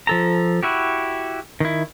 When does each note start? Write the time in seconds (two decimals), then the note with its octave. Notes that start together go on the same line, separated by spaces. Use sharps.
0.07 F3 A4 A#5
0.63 E4 F#4 G4
1.60 D#3 E4